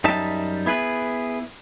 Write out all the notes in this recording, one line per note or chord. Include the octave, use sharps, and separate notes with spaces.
F#2 G3 D#4 E5 A5
B3 E4 G#4 B4